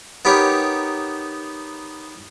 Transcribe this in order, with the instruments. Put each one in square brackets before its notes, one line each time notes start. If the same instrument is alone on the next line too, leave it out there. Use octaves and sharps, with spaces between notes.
[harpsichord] B3 D#4 G4 A#4 C#5